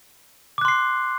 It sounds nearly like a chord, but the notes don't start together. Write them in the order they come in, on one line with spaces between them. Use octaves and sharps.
D6 F#6 C6 C7